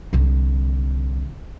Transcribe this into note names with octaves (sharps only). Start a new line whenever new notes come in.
C2 D3